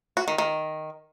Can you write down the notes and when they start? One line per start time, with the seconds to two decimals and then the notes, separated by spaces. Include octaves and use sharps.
0.17 F#4
0.28 D#3
0.38 D#3